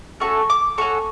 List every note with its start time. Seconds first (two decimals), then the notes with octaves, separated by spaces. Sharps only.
0.20 A3 C#4 F#4 A4 C#6
0.50 D6
0.78 C#4 F#4 A4 C#6